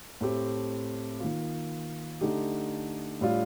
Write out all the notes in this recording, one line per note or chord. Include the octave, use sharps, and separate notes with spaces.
A2 A3 C4 G4
D#3 A#3 F4
D3 A3 D#4 G4
A2 G3 D4 F4